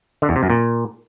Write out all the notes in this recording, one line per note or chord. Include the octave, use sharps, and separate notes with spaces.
D3
E2
C3
F#2
A#2